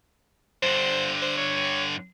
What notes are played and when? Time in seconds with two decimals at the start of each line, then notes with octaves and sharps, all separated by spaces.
0.63 G2 D3 C5
1.22 C5
1.37 C#5